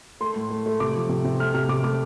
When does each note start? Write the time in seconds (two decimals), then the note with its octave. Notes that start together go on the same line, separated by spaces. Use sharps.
0.21 A3 C6
0.36 A2
0.50 A3
0.66 A3
0.80 C3 D6
0.96 F3
1.09 C3
1.24 C3
1.40 A3 F6
1.54 C3 F6
1.69 C3 D6
1.84 A3 D6